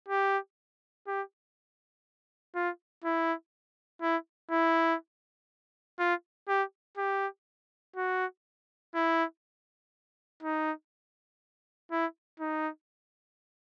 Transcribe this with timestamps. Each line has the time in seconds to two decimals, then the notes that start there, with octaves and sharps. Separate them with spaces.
0.08 G4
1.07 G4
2.55 F4
3.04 E4
4.02 E4
4.51 E4
5.99 F4
6.48 G4
6.97 G4
7.96 F#4
8.95 E4
10.43 D#4
11.91 E4
12.40 D#4